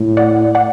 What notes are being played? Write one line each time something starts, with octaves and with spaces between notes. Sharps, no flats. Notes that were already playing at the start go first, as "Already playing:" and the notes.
Already playing: A2
D5 F#5
D5 F#5